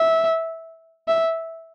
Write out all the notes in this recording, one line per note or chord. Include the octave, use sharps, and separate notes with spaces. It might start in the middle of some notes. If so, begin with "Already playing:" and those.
Already playing: E5
E5